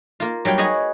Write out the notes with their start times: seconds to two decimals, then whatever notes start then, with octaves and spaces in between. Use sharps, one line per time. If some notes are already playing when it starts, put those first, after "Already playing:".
0.20 A#3 F4
0.45 F#3 G3 F5 G5
0.58 F#4 G#4 B4 C#5 D#5